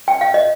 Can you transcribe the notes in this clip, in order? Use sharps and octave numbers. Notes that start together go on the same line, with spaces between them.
G5
F5
D#5